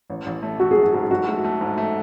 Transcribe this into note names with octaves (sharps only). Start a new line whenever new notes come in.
A1
A1
A3
A3 F#4
G#4
F#3
F#4
G#2
F#3 F#4
A3
A3
G#2
A3